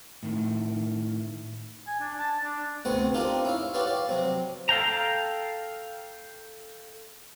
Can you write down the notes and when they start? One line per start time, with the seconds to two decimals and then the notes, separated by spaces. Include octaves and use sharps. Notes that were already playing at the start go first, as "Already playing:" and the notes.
0.23 A2 D#3
1.87 G#5
2.00 D4
2.18 A5
2.44 D4
2.85 D2 C3 B3 C4 C5 C#6
3.14 C4 D4 D#4 F4 G4 A#4
3.45 E4 C#5 F5
3.74 F#4 G4 B4 C#5 D5 F5
3.87 D5 F5
4.08 C3 F#3 C4
4.69 A4 F5 G5 A#5